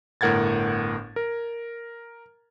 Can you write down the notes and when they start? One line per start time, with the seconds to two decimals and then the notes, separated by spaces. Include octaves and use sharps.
0.21 G1 A2 A#4 F#5 G#6 A6
1.16 A#4